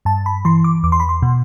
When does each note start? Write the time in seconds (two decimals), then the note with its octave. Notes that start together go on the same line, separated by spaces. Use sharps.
0.05 G2 A5
0.26 B5
0.45 E3 C6
0.64 D6
0.83 E2 D6
0.92 C6
1.00 B5
1.09 C6
1.22 B2